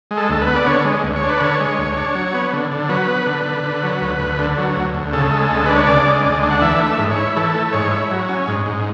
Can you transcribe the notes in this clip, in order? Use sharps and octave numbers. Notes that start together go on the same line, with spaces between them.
G#3
A4
D2 A4
B4
B3
D5
D3 C#5
G#3
D2
C#5
D4
B4
D3 C#5
G#3
D2
D4
F#3
B3
D3
D3
F#3 B4
B3
D3
D3
D3
F#3
D2
D2
D3
F#3
D2
D2
C#3 A4
G#3
D2
D4 B4
C#5
C#3 D5
G#3
D2
D4
F#5
E3 E5
A3
E5
G#2
C#5
E4
E3 A4
A3
G#2 C#5
E4
F#3
C#4
G#2
G#2